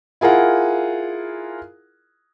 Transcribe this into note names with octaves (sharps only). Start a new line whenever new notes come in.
E4 F4 G#4 A#4 F#5